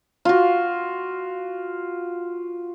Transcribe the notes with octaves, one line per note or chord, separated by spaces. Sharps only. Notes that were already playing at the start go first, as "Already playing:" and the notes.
F4 F#4